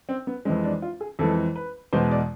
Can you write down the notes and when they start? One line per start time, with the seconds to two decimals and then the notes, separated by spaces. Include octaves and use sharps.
0.09 C4
0.27 B3
0.45 F2 E3 G#3 C4
0.64 D4
0.82 F4
1.01 G#4
1.19 F2 E3 G#3 A4
1.56 B4
1.93 E2 B2 G#3 C5
2.11 D5